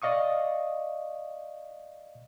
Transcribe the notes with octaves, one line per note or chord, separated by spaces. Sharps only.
D5 D#5 F5 C#6 D#6